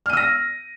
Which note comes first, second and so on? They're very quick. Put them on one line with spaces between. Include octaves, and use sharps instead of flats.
F6 D#7 E6 A#6